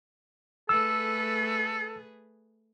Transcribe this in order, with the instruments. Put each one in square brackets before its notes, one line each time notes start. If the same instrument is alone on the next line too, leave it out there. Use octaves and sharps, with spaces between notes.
[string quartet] A3 G#4 B4 [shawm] A4 [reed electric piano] E6